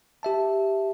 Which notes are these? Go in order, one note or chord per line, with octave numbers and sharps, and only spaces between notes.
G4 E5 A5